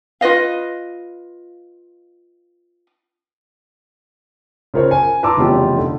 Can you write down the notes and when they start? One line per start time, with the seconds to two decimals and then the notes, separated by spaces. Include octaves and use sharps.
0.21 F4 B4 D#5 F5
4.74 C#3 F4 A#4 C5 C#5
4.91 G#5
5.23 B4 A5 A#5 C6 D6 E6
5.37 F1 E2 C#3 F4 G4
5.77 D3